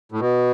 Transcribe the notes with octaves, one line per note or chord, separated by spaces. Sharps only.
A2
B2